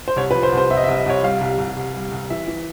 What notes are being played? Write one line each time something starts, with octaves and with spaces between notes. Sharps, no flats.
C5
C2 C#5
B4
F3
C5
C2
C5
C2 E5
D#5
E5
C2
D#5
C2 C#5
G3 F5
C2
C2
C2
G3
C2
E3 E5
E3